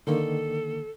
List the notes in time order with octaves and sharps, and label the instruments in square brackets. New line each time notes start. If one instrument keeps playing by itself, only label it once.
[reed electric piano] D3 D#3 A#3 [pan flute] A4